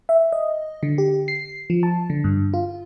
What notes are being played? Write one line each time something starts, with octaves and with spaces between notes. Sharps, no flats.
E5
D#5
D3
G4
C7
F3
A5
D3
G2
F4